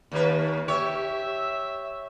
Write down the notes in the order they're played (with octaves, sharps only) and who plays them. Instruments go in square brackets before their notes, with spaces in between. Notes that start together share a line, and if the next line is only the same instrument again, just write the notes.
[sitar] D#2 A#3 B4
[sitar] G4 C#5 [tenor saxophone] E5